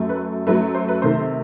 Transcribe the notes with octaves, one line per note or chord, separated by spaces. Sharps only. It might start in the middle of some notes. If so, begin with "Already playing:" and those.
Already playing: F#2 F#3 A3
B4
F#2 F#3 A3 B4
C5
B4
C3 D#3 A3 C5